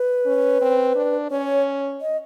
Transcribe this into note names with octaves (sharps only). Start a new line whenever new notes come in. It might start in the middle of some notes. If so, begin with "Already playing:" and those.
Already playing: B4
C#4
C4
D4
C#4 C#5
D#5